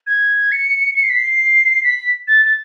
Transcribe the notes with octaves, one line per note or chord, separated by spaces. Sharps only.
G#6
C#7
C#7
C7
B6
C7
B6
A6
A6